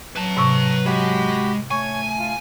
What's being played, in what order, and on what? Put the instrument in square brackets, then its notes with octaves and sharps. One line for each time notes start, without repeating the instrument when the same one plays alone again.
[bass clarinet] F#3 [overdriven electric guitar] B4 A5
[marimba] G#2 C3 C#6
[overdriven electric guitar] G#3 [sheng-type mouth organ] F#4 G4 B5
[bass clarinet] A3 [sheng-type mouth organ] C#5 [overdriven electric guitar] G#5 [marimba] C#6
[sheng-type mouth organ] F4